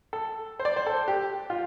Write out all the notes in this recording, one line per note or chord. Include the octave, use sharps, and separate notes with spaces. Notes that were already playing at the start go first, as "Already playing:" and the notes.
A4
C5
D5
C5
A4
G4
F4